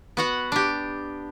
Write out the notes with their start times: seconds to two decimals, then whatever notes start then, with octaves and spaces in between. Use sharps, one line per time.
0.17 B3 F#4 F#5
0.52 D4 G4